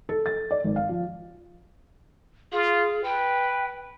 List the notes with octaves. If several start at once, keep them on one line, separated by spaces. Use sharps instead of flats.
A4
A6
D5
G#1
F5
F3
F4 G#4
B4 G5